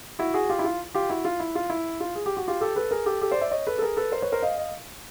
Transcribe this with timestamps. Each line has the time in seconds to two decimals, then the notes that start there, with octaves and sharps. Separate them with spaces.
0.19 E4 F#4
0.34 F#4 G#4
0.49 F4 G4
0.59 E4
0.64 F4
0.95 F4 G4
1.10 E4 F#4
1.25 F4
1.40 E4
1.55 F4
1.70 E4
2.00 F4
2.15 G#4
2.26 G4
2.37 F#4
2.47 F4 G4
2.61 G4 A4
2.76 A4 B4
2.91 G#4 A#4
3.06 G4 A4
3.21 G4 A4
3.31 C5 D5
3.41 D5 E5
3.51 C#5 D#5
3.67 A4 B4
3.78 A4
3.82 G#4 A#4
3.97 A4 B4
4.12 A#4 C5
4.22 B4 C#5
4.32 A#4 C5
4.43 D#5 F5
4.58 D#5 F5